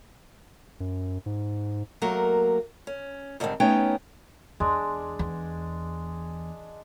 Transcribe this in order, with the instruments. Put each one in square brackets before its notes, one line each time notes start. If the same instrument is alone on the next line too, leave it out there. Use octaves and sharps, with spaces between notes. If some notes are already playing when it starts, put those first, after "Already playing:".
[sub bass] F#2
G#2
[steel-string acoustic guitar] F#3 A3 A#3 A#4
C#4
G#2 D3 D#3 G3 C4
A3 B3 C#4 D#4 C#5 G5
[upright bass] E2 [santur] G#3 D4
[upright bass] E2